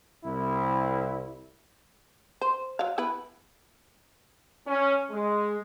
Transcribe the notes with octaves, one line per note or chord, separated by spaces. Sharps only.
C2 E4
C5
F#3 F5
B3 E4 B4
C#4
G#3